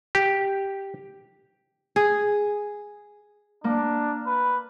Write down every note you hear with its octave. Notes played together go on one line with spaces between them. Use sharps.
G4
G#4
A#3 D4
B4